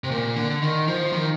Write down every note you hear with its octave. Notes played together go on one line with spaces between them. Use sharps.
C3
A#2
D3
D#3
F3
D#3